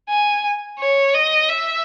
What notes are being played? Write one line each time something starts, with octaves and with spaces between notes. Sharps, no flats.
G#5
C#5
D#5
E5